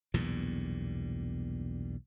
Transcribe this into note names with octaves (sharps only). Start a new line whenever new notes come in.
B1 E2 G2 A#2